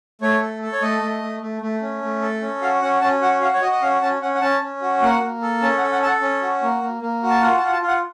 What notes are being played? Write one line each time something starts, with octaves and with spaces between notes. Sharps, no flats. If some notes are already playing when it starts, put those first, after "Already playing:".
A3 C#5
A4
A4
C#5
A3 D#5
A3
A3
A3
A3
C#4
A3
A4
C#4
F#4 F5
C#4 F#5
C#4 A5
F#4 F#5
F#4 F5
C#5
F#4 D#5
D#5
C#4 F5
C#4 A5
C#4 F#5
F#5
C#4 A5
C#4
F#4
A#3 F#5
A#3
A4
C#4 A5
F#5
A4
F#5
A4 F#5 A5
C#4
F#4
A#3
A#3
A#3
F#4
A5
F4 F#5
A5
F4 F#5
A5
F4
F#5